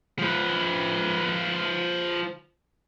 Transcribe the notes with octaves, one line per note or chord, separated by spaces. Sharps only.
F3 B4